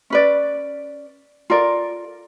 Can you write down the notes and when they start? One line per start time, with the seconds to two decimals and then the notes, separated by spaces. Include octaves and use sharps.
0.10 C#4 B4 D5
1.50 F4 A4 A#4 D5